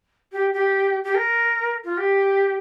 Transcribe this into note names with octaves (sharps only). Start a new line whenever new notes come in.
G4
G4
G4
A#4
F4
G4